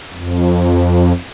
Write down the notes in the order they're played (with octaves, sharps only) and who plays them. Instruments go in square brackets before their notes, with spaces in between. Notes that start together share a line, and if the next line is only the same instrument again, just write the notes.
[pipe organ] F2